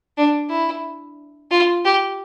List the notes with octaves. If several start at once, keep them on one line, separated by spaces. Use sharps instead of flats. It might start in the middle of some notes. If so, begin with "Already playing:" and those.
D4
E4
F4
G4